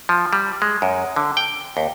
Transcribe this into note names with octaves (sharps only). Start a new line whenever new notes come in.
F3
G3
G#3
F#2
D3
G5
D#2